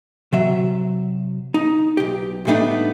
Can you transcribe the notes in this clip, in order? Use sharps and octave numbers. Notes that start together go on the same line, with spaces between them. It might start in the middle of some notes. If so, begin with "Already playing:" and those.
C3 F#3 E5
D#4
B1 G4
A2 G3 A3 B3 D4 D#4